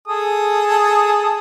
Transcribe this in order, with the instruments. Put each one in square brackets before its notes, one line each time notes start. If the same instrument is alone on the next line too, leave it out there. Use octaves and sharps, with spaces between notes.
[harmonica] G#4 A4 D#6